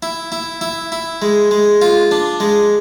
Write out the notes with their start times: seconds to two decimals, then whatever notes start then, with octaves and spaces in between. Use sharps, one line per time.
0.03 E4
0.32 E4
0.61 E4
0.92 E4
1.22 G#3
1.51 G#3
1.82 F4
2.11 D4
2.40 G#3